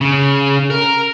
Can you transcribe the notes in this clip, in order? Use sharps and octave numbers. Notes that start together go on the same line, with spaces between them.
C#3
A#4